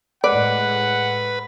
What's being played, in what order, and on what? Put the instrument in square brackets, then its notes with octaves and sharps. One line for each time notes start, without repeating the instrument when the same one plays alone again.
[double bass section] A2 G#3 [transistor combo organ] B4 [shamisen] D5 [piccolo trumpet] F#5